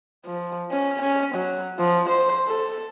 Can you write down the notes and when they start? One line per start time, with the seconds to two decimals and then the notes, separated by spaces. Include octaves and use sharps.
0.26 F3
0.72 C#4
1.02 C#4
1.35 F#3
1.79 F3
2.09 C5
2.48 A4